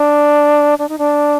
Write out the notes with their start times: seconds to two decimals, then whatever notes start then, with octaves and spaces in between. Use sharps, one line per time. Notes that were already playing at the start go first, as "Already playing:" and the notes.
Already playing: D4
0.79 D4
0.89 D#4
0.98 D4